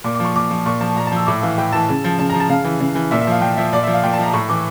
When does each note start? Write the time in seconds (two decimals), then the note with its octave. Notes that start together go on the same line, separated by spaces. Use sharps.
0.04 A#2 D6
0.15 D6
0.20 F3 C#6
0.36 A#2 D6
0.51 F3
0.66 A#2 C#6
0.81 F3 A5
0.96 A#2 A#5
1.07 A5
1.12 F3 E6
1.27 A2 D6
1.42 E3 F5
1.58 A2 G5
1.72 E3 A5
1.89 C#3
2.04 F3
2.19 C#3 A5
2.30 A#5
2.34 F3
2.40 A5
2.49 C#3 F5
2.64 E3
2.80 C#3
2.95 E3
3.11 A#2 E5
3.21 E5
3.27 F3 F5
3.41 A#2 G5
3.57 F3 E5
3.73 A#2 D5
3.83 F3 E5
3.93 F5
4.03 A#2 G5
4.13 A5
4.18 F3 A#5
4.33 A2 C#6
4.49 E3 D6